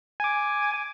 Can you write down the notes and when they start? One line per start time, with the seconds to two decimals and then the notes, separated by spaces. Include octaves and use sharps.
0.20 G#5 D6